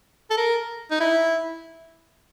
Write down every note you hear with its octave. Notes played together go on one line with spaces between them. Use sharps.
A4
A#4
D#4
E4